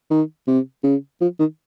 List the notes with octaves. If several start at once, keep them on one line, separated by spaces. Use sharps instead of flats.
D#3
C3
C#3
F3
D#3